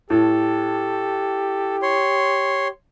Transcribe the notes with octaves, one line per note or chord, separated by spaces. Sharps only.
A2 G4 A4
C#5 C6